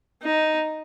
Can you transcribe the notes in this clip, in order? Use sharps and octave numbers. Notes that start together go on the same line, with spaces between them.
D#4